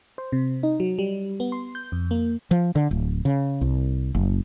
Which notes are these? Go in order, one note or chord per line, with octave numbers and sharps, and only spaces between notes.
C5
C3
D#4
F#3
G3
B3
C6
G6
F2
A#3
F3
D3
D1
C#3
C2
F#1